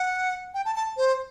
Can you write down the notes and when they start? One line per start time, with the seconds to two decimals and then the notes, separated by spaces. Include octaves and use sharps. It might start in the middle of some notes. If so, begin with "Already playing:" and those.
Already playing: F#5
0.54 G5
0.65 A5
0.76 A5
0.97 C5